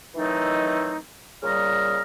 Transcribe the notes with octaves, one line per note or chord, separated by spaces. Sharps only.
D#3 E3 F#3 A3 C4 D#4
A#2 C#3 G3 D#5 A#5 F6